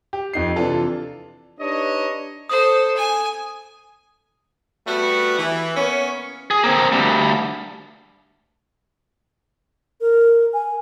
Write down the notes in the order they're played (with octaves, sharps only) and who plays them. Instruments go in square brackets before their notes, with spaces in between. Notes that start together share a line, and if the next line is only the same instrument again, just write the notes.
[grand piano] G4
F2 D#4 C7
C3 E3 D4 F4 A4
[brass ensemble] D4 D#4 G4 B4 C#5 D#5
[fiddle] A4 C5 [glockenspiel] D#6
[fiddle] G#5
[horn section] G3 A3 B3 F#4
E3
A#3 B3 C#4
[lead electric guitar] G#4
A#3 C4
D2 G3
[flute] A#4
G#5